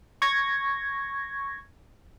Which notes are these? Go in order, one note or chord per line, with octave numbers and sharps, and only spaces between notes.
C#6 G#6 A#6